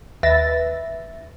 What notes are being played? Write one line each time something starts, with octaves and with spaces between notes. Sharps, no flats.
D#2 B4 E5 A6 A#6